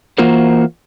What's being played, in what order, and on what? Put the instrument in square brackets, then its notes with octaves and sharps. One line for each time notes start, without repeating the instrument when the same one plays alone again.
[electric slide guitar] E3 A#3 F4 F#4 A#4 C5